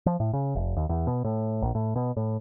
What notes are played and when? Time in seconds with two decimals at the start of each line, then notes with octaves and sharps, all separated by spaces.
0.06 F3
0.20 A2
0.33 C#3
0.55 F1
0.77 D#2
0.89 E2
1.07 B2
1.24 A2
1.62 A#1
1.75 A2
1.96 B2
2.17 A2